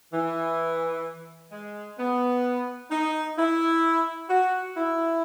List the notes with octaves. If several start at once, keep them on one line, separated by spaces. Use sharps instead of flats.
E3
G#3
B3
D#4
E4
F#4
E4